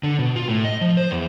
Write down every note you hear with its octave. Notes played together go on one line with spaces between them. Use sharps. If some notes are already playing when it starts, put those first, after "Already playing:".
D3
B2
F4
A2
D#5
F3
C5
E2